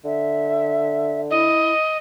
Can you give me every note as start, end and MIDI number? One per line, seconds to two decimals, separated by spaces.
0.05 1.50 50
0.05 1.21 76
1.30 1.72 64
1.30 1.97 75